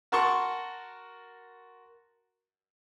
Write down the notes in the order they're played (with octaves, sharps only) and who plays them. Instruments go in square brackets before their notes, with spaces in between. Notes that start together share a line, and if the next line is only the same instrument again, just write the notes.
[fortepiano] F#4 A#4 A5 C6 C#6